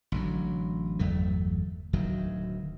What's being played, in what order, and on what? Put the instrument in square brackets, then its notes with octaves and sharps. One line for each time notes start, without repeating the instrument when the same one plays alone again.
[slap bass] A1 D3 F#3
G1 E2 F#3 A3
D1 D2 D#3 F#3